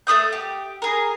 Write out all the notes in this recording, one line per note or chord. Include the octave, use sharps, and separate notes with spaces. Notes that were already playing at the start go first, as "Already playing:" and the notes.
A3 B4 D#6 G6
G4
G#4 A#4